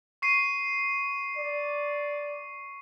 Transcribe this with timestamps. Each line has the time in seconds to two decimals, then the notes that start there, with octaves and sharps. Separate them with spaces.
0.22 C#6 C7 D#7
1.37 D5